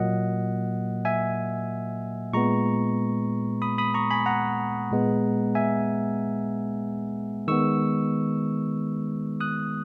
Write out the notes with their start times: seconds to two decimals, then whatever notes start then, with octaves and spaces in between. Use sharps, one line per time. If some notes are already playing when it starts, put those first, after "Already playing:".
Already playing: A#2 F#3 A#3 D#5 F#5
1.05 E5 G#5
2.33 A#2 G#3 B3 A#5 C#6
3.62 B5 D#6
3.78 B5 D#6
3.94 A#5 C#6
4.11 G#5 B5
4.26 F#5 A#5
4.91 A#2 G#3 B3
5.55 E5 G#5
7.47 D#3 G#3 B3 C#6 E6
9.40 D#6 F#6